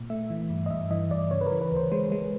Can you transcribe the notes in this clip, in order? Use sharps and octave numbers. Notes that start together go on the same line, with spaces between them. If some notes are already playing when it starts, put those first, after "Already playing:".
Already playing: A#2
A3 E5
E3
G2
D#5
G2 E5
E3 D#5
G2 D5
C#3 C#5
B4
A#4
E3
B4
D2
C5
G#3 C5
G#3